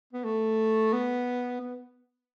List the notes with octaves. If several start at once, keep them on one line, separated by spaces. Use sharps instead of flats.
B3
A3
B3
B3